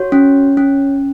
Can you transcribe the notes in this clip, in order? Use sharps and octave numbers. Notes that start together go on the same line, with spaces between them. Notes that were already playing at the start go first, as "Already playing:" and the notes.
Already playing: F#4 C#5
C#4
C#4